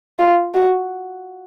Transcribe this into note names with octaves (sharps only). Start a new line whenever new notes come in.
F4
F#4